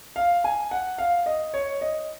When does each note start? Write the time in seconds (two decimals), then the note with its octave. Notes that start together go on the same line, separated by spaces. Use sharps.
0.16 F5
0.44 G#5
0.71 F#5
0.98 F5
1.26 D#5
1.54 C#5
1.81 D#5